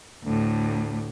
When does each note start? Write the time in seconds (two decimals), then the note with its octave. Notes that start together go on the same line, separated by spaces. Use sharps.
0.24 D2 A2